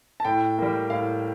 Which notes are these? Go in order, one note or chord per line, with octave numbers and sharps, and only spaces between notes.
A5
A2 G5
G3 A#3
A2 F5